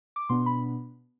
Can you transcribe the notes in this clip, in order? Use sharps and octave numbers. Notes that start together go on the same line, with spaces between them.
D6
B2 B3 D4 C6
B5